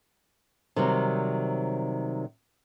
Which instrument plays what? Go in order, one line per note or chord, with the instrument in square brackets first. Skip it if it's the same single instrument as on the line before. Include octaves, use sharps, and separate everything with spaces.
[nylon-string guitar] C3 D#3 F#3 G3 C4